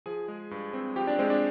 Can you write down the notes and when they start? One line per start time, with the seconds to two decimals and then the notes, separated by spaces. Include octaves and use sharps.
0.06 F3 G#4 G#5
0.28 G#3
0.51 G2
0.73 C4
0.96 F3 G4 G5
1.07 D4 D5
1.18 G#3 C4 C5
1.30 D4 D5